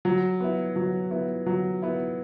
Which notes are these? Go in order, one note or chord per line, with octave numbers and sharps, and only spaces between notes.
F#3
B3 E4
F#3
B3 E4
F#3
B3 E4